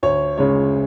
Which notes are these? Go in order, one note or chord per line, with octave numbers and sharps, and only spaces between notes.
D2 C#5
C#3 G#3 C#5